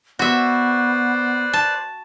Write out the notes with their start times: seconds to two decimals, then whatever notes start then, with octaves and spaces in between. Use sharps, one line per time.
0.19 B3 F#4 B4 C5 D5 E5
1.53 A5